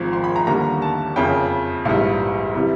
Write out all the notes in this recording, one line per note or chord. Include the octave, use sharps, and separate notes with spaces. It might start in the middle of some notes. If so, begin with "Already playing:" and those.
Already playing: G#1 G#2 F3
C6
B5
A#5
D#2 D3 G3 A#3 A#5
A5
F#1 F2 C#3 G5
A#1 G#2 E3 G3 F5
C3 E3 G3